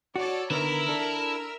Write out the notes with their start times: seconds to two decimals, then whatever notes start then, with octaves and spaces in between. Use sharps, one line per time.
0.16 F#4 A4 C#5 D5
0.50 D3 D#3 B3 E4 A#4 E5 E6
0.88 D4 A4